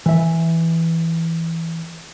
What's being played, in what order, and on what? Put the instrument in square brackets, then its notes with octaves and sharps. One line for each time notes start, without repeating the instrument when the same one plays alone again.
[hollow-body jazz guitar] E3 E5